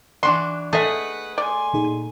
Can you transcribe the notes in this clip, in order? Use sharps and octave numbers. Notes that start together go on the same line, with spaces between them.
E3 D4 F#4 C6
A3 G#4 A4 B4 D#5 E5 F#5
D5 G#5 C6
A#2 D#4 G#4